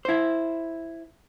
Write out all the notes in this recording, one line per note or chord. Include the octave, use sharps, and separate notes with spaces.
E4 C5